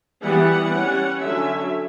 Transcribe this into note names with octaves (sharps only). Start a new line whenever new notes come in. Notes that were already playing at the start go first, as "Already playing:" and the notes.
E3 G3 B3 F#5
G3 C#4
D3 F#3 C#4 E5